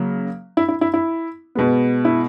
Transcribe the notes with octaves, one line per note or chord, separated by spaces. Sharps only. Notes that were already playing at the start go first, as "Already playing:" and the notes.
Already playing: C#3 F#3 A#3
E4
E4
E4
E4
B2 G#3 B3
E4